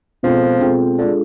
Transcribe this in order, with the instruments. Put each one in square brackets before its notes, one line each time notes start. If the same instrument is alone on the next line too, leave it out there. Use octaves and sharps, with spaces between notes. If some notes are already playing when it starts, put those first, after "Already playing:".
[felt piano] B2 G#3 C4 F4 A4 [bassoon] F3
[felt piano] B2 G#3 C4 F4 A4
[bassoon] D3 [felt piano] G#3 D4 F4 A4